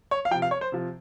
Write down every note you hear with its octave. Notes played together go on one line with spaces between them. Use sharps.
C#5
F5
C3 F3 G5
F5
C#5
C5
C3 F3